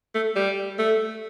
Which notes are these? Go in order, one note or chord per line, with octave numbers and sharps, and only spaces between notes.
A3
G3
A3